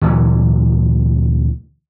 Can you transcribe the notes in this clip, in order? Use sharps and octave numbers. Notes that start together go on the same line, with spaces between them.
D2 A#2 E3 F#3